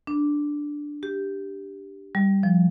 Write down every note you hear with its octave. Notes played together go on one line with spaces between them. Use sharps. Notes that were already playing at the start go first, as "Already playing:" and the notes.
D4
G4
G3
F3